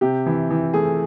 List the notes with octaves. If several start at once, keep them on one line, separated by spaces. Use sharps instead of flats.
C3 G4
E3
E3
A3 G#4